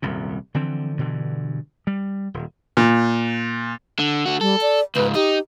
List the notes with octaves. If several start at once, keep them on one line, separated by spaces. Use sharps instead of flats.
D#1 C2 F#2 C3
D3 E3 F3 C4
G2 B2 D3 E3
G3
D#1
A#2
D3
D3 F#4
G3 A4
D5
C#2 G#2 B4
D#4 G4